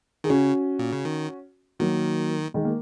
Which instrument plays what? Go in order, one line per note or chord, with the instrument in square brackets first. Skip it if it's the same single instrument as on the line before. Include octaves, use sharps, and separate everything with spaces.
[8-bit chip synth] D#3 [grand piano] G#4
[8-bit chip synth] C#3 [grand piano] C#4 F#4
[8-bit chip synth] A#2
C#3
D#3
[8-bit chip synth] D#3 [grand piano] F#3 A#3
[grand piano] D#3 G#3
A#3